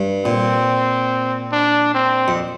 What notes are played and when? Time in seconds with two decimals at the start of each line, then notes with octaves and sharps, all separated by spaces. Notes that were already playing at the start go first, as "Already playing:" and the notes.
Already playing: G2
0.25 A#2 C4
1.52 D4
1.95 C4
2.28 F2